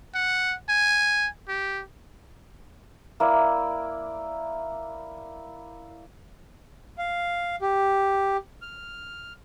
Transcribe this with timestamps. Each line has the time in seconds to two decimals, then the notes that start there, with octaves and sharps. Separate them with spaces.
0.15 F#5
0.69 G#5
1.48 G4
3.20 A#3 E4 D5
6.98 F5
7.62 G4
8.62 F6